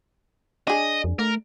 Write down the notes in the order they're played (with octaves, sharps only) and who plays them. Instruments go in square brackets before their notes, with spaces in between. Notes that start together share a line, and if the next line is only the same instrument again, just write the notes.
[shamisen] D4 G#4 [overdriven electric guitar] D#5
[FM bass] F2
[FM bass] A3 [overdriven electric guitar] A#4